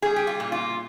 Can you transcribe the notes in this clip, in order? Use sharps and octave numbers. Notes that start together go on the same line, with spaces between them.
G3 G#4
G4
F4
A#2
F4